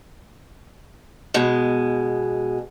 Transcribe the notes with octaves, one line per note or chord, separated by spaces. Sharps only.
B2 G#3